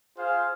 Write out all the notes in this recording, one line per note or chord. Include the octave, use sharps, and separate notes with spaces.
F4 G#4 C5 F5